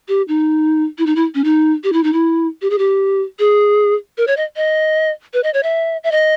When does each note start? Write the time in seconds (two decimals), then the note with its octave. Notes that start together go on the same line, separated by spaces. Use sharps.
0.09 G4
0.28 D#4
0.98 E4
1.06 D#4
1.16 E4
1.35 C#4
1.44 D#4
1.84 G4
1.93 E4
2.04 D#4
2.13 E4
2.62 G4
2.70 G#4
2.78 G4
3.39 G#4
4.18 A#4
4.27 C#5
4.37 D#5
4.56 D#5
5.34 B4
5.44 D#5
5.54 C#5
5.63 E5
6.04 E5
6.12 D#5